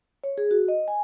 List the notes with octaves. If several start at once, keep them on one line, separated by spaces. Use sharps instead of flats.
C#5
G#4
F#4
D#5
G#5